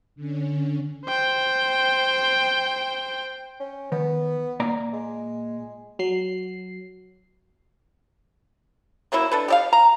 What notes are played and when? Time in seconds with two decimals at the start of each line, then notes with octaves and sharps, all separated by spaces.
0.15 D3 C#4
1.06 C5 G5
3.60 C#4
3.92 D#3 B3
4.60 A#2 D5 A#5
4.93 G#3
5.99 F#3 C7
9.12 F#3 A#3 C#4 E4
9.31 D4 A4 B4
9.48 G4 D5 F5
9.73 A#5